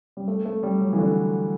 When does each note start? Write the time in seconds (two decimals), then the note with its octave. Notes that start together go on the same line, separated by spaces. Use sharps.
0.17 G3
0.28 A3
0.45 A3
0.63 G3
0.81 F#3
0.93 E3
0.98 D3